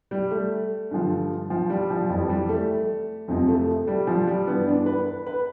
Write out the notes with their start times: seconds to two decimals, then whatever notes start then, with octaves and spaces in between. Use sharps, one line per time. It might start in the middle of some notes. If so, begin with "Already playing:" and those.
0.11 G3
0.31 A3
0.91 G2 D3 F3
1.50 F3
1.70 G3
1.90 F3
2.09 F2 E3 G3
2.29 G3
2.49 A3
3.28 F2 C3 F3
3.48 A3
3.67 A3
3.87 G3
4.07 F3
4.27 G3
4.47 G2 E3 B3
4.67 D4
4.86 B4
5.06 B4
5.27 B4